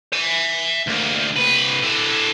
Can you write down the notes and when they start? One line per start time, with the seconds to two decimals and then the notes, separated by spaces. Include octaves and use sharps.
0.13 E5 G#5
0.87 D2 A#3
1.36 C2 B4
1.82 D3 E4